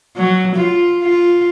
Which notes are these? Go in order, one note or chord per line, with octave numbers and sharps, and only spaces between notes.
F#3
F4
F4